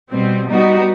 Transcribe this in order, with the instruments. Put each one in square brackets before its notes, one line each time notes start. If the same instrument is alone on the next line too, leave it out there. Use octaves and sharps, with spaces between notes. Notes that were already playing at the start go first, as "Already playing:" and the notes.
[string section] B2 G3 C4
G3 B3 D#4 F#4